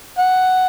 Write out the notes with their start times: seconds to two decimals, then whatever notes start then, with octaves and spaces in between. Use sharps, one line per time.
0.19 F#5